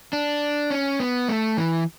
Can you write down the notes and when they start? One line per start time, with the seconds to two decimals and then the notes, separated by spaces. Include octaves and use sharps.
0.13 D4
0.71 C#4
1.00 B3
1.29 A3
1.57 E3